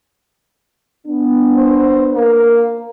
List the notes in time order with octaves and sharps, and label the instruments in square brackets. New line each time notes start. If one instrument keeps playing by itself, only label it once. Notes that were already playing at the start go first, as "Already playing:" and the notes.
[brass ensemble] B3 D4
[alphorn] C5
A#3